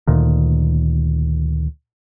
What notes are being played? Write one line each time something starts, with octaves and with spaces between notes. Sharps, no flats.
D2 A#2 D#3